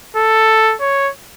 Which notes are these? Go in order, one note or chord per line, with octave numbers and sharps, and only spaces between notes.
A4
C#5